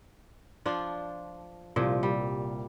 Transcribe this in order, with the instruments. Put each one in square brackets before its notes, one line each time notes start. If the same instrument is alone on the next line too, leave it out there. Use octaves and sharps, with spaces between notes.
[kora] F3 D4 F4
[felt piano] C2 [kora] A#2 F3
[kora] G3